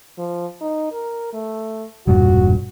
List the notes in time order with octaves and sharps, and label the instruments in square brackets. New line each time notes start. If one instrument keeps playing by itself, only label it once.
[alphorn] F3
D#4
A#4
A3
[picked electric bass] E1 G2 A#2 [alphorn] F#4